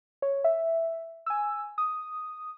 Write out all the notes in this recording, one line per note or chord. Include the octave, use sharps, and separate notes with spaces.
C#5
E5
G#5 E6
D#6